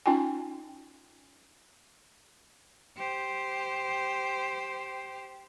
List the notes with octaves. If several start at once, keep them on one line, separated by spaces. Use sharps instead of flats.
C#4 D#4 F4 G5 G#5
G4 C5